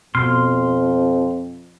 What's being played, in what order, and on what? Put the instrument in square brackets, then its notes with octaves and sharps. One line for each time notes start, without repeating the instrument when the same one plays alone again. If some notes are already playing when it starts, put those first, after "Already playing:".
[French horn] F2 [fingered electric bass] B2 [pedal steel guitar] C6 F6